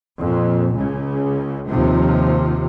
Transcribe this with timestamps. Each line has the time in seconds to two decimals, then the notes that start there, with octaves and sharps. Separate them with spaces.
0.20 F2 A#2
0.74 C#2 C#3
1.68 D#2 C3 F3